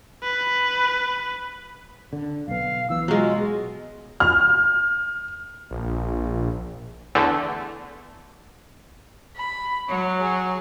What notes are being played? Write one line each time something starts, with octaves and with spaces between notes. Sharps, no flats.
B4
D3
B1 B3 F5
E3 B3 E6
B2 F#3 G#3 F4
F6
A#1
E2 D3 A3
B5
F#3 C#5
G#4